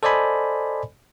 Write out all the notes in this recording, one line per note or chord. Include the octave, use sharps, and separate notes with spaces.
A4 C5 D5 D#5 G#5 B5